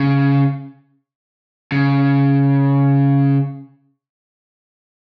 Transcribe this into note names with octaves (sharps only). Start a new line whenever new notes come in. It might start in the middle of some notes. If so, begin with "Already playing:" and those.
Already playing: C#3
C#3